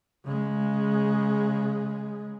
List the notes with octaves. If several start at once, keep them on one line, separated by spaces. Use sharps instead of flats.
C#3 G#3